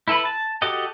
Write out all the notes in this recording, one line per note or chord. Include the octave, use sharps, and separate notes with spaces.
E4 A4 B4 B5
A5
F#4 G4 A4 D#5 F#5